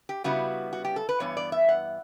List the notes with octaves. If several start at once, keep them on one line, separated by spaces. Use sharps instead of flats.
G4
C#3 G3 B3 E4 F#4
F#4
G4
A4
B4
G2 E3 B3 C#5
D5
E5
F#5